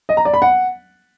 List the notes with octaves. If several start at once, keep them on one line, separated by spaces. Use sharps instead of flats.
D#5
A#5
D5
B5
F#5